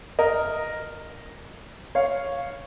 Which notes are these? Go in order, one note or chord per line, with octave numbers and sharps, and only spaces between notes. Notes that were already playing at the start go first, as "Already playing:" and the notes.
A#4 D#5
C#5 F5